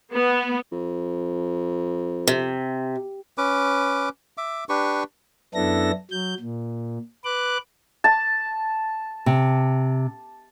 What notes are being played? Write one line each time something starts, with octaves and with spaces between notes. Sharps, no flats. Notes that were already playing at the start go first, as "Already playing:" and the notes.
B3
F2
C3
C#4 B4 D6
E5 D6
D4 G4 B4 C#6
F#2 B3 D4 E4 A4 A#6
F#3 G6
A#2
B4 D6 F#6
A5
C3